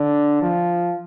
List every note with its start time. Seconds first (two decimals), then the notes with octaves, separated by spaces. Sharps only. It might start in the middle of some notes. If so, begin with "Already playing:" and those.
Already playing: D3
0.42 F3